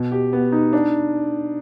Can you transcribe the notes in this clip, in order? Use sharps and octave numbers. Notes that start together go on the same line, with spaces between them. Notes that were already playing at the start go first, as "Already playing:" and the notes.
Already playing: B2
G4
B3
D#4
D4